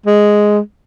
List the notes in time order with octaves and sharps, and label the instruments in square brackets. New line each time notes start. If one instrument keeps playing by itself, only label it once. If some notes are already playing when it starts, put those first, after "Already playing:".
[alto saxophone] G#3